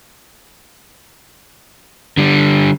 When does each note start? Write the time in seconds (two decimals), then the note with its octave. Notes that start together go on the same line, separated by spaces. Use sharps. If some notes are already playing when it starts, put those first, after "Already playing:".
2.17 D3 G3